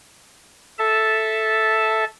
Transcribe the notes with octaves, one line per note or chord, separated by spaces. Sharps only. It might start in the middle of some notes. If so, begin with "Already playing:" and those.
A4 E5 A5